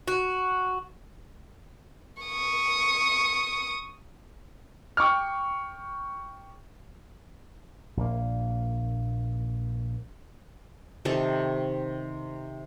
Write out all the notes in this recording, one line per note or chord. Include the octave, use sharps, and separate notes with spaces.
F#4
C#6 D#6
G5 C#6 D6 F6
A#1 A#3
C3 D#3 A4